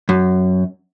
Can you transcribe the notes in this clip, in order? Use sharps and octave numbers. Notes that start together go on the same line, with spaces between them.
F#2